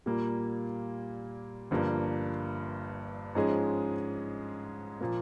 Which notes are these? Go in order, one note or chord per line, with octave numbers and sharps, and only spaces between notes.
A#2 G3 A#3
G1 G2 F3 A#3
G#2 F3 G#3 C#4 G#4
A#2 F3 A#3